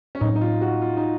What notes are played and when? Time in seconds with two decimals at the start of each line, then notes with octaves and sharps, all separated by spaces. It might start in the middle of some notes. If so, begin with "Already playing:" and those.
0.15 C#4
0.21 A2 F#3 C4 D#4
0.36 D#4
0.41 F4
0.61 F#4
0.82 F4
0.97 D#4